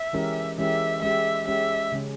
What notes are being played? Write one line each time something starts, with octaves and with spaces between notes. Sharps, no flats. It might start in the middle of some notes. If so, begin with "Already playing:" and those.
Already playing: E5
E3 G#3 C#4 G4 A#4
E3 G#3 C#4 G4 A#4 E5
G#3 C#4 G4 E5
G#3 C#4 G4 E5
C#3 G#3 C#4